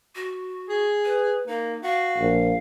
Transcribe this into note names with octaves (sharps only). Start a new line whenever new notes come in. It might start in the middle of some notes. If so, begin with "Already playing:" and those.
F#4
G#4
B4
A#3 D#4
F#4 F5
A#1